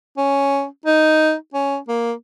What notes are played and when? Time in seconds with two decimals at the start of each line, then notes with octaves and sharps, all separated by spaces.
0.17 C#4
0.86 D#4
1.54 C#4
1.89 A#3